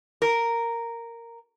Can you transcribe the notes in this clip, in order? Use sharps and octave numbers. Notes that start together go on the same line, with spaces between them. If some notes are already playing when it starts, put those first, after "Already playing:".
A#4